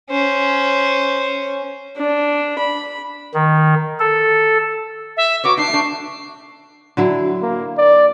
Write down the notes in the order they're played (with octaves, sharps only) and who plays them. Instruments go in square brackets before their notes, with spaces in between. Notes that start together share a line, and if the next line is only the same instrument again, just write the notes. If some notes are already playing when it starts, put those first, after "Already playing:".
[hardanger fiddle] C#4 C5
[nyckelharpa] D4
B5
[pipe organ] D#3
A4
[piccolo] E5
[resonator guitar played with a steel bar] F#4 B4 C#5 [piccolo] D6
[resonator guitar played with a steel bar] D4 D#4 [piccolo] C7
[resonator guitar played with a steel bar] A3 D4
[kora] D3 F#3 E4
[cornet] A#3
D5